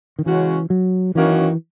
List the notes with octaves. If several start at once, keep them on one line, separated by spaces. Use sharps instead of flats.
D#3
C#3 E3 G#3 C#4 F#4
F#3
F#2 D#3 E3 A#3 C#4 F#4